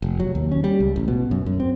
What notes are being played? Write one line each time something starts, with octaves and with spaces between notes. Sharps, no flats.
F1
F#3
D#2
C#4
G3
C#2
A1
B2
F#2
F#2
C4